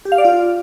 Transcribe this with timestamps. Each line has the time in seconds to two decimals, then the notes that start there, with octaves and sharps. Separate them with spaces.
0.05 G4
0.12 F5
0.18 D5
0.25 F4